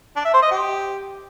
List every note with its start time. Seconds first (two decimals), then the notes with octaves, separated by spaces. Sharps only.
0.16 D4
0.25 E5
0.34 C5
0.42 D#5
0.51 G4